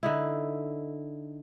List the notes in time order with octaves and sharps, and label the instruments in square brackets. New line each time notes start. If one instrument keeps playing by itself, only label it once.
[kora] D3 D#4 E4